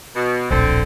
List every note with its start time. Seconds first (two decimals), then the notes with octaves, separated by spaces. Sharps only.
0.15 B2
0.50 D1 A#1 D3 C4